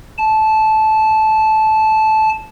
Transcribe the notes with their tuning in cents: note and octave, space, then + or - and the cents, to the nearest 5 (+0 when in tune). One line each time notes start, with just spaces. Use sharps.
A5 -15